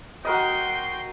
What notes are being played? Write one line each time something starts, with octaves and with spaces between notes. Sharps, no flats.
F#4 A#4 D#5 G5 C6